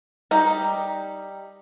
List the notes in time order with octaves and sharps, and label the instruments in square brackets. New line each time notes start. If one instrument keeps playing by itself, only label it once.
[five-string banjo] G3 D#4 G4 A#5